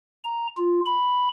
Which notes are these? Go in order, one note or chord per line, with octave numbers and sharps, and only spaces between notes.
A#5
F4
B5